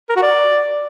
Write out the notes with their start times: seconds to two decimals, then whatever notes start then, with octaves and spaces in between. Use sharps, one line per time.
0.09 A#4
0.16 F#4
0.23 D5